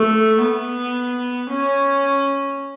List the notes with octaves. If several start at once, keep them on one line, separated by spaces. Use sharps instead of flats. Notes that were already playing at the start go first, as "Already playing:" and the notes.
Already playing: A3
B3
C#4